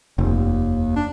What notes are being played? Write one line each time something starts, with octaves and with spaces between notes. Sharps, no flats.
F1 D#2
D4